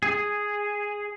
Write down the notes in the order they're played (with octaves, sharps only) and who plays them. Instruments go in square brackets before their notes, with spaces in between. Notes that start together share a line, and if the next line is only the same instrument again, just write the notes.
[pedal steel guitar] G#4